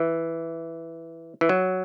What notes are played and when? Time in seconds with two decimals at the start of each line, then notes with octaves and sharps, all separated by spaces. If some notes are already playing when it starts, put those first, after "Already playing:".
Already playing: E3
1.41 E3
1.49 F#3